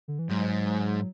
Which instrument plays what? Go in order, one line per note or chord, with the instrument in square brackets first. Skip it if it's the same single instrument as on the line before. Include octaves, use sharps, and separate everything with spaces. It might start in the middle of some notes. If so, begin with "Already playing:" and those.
[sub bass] D3
E3
[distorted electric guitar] G#2 [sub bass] F#3